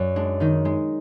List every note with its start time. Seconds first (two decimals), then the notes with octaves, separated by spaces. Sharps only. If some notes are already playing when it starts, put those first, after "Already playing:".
Already playing: F#2 D5
0.16 G#3 D4
0.40 D#3 D#4
0.65 G#3